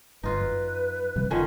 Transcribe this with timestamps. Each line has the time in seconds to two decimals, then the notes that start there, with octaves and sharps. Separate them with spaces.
0.23 G1 D#4 F4 B4
0.41 F#2
1.16 C3 E3 G3
1.31 F#1 D3 D#3 C#4 F4